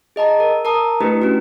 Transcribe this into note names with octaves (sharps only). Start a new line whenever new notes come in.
G#4 D#5 A5 A#5
A#4
A#4 A5 A#5 D#6
A3 D4 E4 G4 B4
C#4 F#4